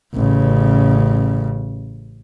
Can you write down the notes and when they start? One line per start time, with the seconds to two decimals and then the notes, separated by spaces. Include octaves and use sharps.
0.14 A1 C#3